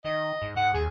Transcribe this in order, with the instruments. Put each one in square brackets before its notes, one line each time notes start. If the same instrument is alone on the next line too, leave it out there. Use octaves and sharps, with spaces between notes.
[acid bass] D#3 [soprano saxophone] D#5
[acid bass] G#2
[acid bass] G#2 [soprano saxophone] F#5
[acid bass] D#2 [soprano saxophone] G#4